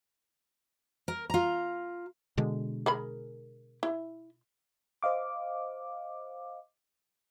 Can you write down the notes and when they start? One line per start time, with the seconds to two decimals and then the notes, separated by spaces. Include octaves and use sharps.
1.08 A#4
1.30 F4 A#5
2.37 B2 D3 G#3
2.86 G#4 A#4 B5
3.83 E4
5.03 C5 D#5 F5 D6